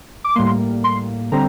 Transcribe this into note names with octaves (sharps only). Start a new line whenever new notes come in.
D6
A2 G3 A#3 C6
C6
D3 G3 C4 A#5